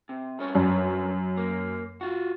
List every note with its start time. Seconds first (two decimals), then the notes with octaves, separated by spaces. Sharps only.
0.09 C3
0.39 G2 C#4 C#5
0.55 F#2
1.37 A#3
2.01 F4 F#4